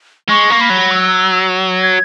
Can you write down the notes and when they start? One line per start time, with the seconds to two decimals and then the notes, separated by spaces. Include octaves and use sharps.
0.29 G#3 C#6
0.50 A#3
0.61 B5
0.70 F#3
0.91 E6
1.82 G#6